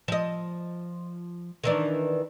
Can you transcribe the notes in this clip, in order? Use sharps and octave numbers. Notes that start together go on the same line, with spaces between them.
F3 D#5
D#3 E3 D4